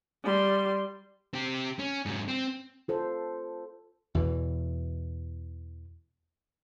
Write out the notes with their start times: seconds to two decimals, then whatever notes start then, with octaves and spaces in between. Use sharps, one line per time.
0.24 G3 C6
1.33 C4 G4
1.79 C#4
2.06 G#2 F#3
2.28 C4
2.88 F4 A4 C5
4.15 E2 B2 E3